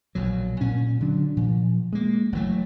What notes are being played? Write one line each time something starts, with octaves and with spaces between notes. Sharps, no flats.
A#1 B2 F#3
A#2 C#4
D3 F#3 D4
A#2 F3
G#3 A#3
F#1 E3 F#3 A3